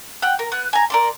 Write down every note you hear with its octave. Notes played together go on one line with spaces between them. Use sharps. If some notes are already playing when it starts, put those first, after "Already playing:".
F#5 G5
A#4
B3 F#6
G#5 A#5
A#4 D5 C6